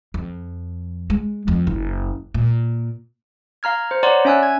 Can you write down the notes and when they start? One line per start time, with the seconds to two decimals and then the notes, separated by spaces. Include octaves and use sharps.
0.14 F2
1.10 G#3
1.48 F2
1.67 F#1
2.34 A#2
3.63 F5 A#5 F6 G#6
3.91 C5
4.03 C#5 D5 F#5 A#5 C6
4.25 C#4 E5 G#5 E6 F#6
4.43 G#6